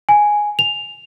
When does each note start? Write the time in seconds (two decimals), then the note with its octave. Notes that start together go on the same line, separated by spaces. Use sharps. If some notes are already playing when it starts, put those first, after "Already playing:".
0.09 G#5
0.59 F7